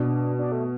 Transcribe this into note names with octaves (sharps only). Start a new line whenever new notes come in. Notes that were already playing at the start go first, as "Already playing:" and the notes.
Already playing: B2 D4
D4
A3